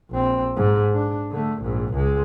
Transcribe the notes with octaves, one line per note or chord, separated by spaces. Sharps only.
A#1 C4
G#2
D4
D3 A3
A#1 G#2
C#2 G#3